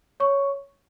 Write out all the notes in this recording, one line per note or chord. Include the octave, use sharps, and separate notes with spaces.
C#5 C#6